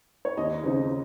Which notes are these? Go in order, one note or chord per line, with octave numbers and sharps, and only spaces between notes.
C#5
D#2 D#5
C#3 F3 C4 D#4